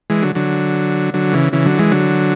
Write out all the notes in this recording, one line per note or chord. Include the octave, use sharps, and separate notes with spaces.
E3 G#3
D3 F#3
D3 F#3
D3 F#3
C#3 E3
C#3 E3
D3 F#3
E3 G#3
D3 F#3